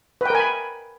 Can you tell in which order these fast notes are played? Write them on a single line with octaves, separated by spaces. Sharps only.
B4 G5 A#4 G#5 B5